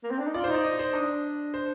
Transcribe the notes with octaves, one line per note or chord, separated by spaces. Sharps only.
A#3
C4
D4
D#4
F4 D5
C5
D#4 D5
D#5
C5
D4 D#5
C5